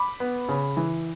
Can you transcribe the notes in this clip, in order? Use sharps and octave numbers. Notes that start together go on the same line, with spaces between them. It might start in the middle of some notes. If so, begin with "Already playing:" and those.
Already playing: B5 D6
B3
C#3
E3